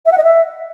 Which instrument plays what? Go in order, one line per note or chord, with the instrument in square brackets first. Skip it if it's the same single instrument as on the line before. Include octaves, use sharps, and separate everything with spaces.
[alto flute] E5
F#5
D#5
E5